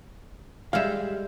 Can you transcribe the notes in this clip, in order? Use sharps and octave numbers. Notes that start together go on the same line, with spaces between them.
G3 G#3 E5 F5